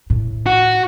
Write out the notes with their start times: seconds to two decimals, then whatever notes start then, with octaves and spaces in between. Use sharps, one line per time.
0.10 A2
0.46 F#4